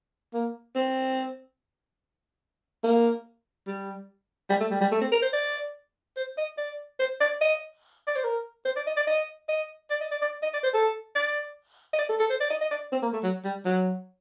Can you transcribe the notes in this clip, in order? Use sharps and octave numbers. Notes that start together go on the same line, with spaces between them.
A#3
C4
A#3
G3
G3
A3
G3
G3
A3
C4
A#4
C5
D5
C5
D#5
D5
C5
D5
D#5
D5
C5
A#4
C5
D5
D#5
D5
D#5
D#5
D5
D#5
D5
D5
D#5
D5
C5
A4
D5
D#5
D5
A4
A4
C5
D5
D#5
D#5
D5
C4
A#3
A3
F#3
G3
F#3